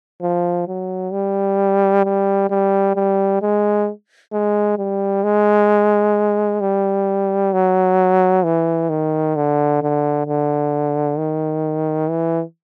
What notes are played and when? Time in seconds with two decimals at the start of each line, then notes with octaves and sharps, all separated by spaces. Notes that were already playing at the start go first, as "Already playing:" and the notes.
0.22 F3
0.68 F#3
1.12 G3
2.05 G3
2.50 G3
2.96 G3
3.42 G#3
4.33 G#3
4.78 G3
5.24 G#3
6.61 G3
7.53 F#3
8.44 E3
8.89 D#3
9.36 D3
9.82 D3
10.27 D3
11.18 D#3
12.09 E3